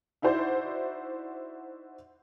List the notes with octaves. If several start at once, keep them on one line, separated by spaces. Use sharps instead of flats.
D#4 E4 F#4 C5 D5